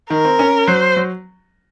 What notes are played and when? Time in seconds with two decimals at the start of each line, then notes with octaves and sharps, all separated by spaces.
0.10 D#3 A#4
0.25 C4
0.39 C#4
0.68 F#3 C5
0.97 F#3